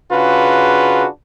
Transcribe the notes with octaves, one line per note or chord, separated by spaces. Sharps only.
C#3 D4 F4 F#4 G#4 B4